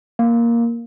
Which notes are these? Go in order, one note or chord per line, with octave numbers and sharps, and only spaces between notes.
A#3